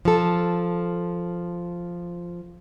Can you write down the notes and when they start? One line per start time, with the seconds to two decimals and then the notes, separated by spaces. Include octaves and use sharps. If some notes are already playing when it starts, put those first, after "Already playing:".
0.05 F3 A4